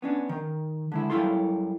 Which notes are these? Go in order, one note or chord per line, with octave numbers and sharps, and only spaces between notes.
B3 C#4 D4
D#3
D3 G#3 E4
F#2 G3 E4 F4 A4 C6